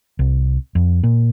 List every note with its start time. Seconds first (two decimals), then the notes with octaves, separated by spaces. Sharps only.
0.19 C2
0.75 F2
1.03 A#2